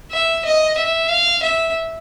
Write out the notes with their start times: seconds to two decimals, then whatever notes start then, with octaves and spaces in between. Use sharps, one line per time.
0.12 E5
0.45 D#5
0.78 E5
1.10 F5
1.43 E5